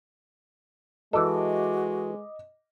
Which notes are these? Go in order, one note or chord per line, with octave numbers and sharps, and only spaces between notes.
E3 G#3 F#4 A4 D#5 D6